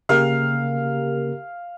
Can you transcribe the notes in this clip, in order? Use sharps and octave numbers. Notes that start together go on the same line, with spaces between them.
C#3 A#3 G4 A#4 F5